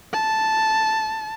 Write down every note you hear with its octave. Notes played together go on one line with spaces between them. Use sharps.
A5